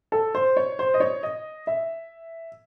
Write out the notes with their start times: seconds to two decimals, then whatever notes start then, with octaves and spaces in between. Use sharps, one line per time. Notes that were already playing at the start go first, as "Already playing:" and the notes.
0.12 A4
0.35 C5
0.57 C#5
0.79 C5
0.94 D#5
1.00 C#5
1.23 D#5
1.67 E5